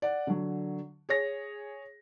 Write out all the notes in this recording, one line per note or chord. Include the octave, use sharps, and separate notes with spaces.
D5 F#5
D3 F#3
G#4 C#5 A#6